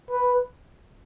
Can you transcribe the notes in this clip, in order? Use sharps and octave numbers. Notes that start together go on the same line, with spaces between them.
B4